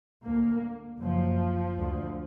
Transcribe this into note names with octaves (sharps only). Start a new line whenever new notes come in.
D2 A#3
F#1 F#2 F3
D2